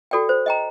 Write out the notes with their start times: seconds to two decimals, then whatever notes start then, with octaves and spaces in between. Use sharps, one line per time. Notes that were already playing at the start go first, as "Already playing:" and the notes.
0.11 F#4 A4 D5 G5
0.29 C5
0.46 D#5 G5 A#5